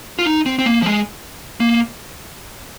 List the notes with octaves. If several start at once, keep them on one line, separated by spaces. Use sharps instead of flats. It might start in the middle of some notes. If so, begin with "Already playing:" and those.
F4
D#4
C4
C4
A#3
F3
G#3
A#3